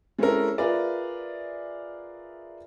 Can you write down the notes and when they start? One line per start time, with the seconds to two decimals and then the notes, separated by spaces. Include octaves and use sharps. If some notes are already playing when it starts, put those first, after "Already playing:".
0.18 G#3 C4 C#4 E4 A4 A#4
0.58 F4 G#4 A#4 B4 D5 E5